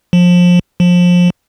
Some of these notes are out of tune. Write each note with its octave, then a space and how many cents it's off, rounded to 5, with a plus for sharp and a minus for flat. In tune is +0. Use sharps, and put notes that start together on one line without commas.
F3 +25
F3 +25